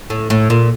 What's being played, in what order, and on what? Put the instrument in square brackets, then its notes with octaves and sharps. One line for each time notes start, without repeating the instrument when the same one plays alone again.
[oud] A2
A2
A#2